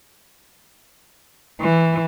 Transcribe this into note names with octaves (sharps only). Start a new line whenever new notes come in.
E3